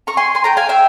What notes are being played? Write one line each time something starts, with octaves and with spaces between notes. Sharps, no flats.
A#5 C#6
G#5 C6
G#5 C6
G5 A#5
F5 G#5
E5 G5